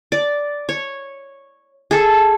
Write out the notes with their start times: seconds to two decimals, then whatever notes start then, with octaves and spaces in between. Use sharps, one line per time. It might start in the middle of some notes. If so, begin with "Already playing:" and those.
0.12 D5
0.69 C#5
1.91 G#4 A4